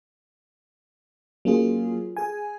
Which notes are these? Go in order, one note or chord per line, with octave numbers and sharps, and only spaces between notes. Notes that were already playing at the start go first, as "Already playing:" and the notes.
F#3 A#3 C#4 F4 G#4
G#4 G#5